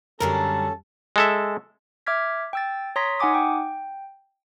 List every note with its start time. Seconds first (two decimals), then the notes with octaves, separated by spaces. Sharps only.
0.20 F#2 D3 G3 C#4 A4 A#4 A5
1.16 G#3 A4 E5
2.07 E5 D6 F6 G#6 B6
2.53 G5 E6 A6
2.96 C#5 A#5 C6 D#6 A#6 B6
3.19 D#4 F#5 G#5 D6 D#6
3.34 G5